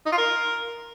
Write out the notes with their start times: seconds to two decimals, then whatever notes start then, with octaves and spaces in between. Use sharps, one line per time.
0.06 D#4
0.12 F4
0.18 A#4